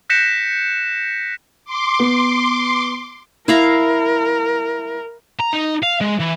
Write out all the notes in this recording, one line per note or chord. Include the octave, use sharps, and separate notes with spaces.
F#6 G6 A#6 B6 C#7 E7
C6 D6
B3
E4 A#4 F5 A#5
A#5
D#4
F5
G#3
E3